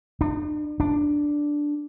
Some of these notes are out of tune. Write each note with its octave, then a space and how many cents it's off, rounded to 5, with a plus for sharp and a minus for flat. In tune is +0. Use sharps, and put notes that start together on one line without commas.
D4 +40
D4 +0